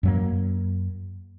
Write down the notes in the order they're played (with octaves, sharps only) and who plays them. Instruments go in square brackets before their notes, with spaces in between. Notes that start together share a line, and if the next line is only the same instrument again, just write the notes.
[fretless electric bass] F#2 F#3 A#3